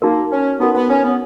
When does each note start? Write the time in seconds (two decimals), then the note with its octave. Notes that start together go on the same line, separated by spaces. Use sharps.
0.02 A#3 D#4 F#4 A#4
0.31 C#4
0.59 B3 D#4 F#4 A#4
0.75 B3
0.90 C#4
1.04 B3